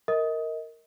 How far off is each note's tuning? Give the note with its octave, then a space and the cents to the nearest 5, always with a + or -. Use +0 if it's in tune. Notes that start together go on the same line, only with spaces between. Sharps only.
A#4 -10 D#5 +30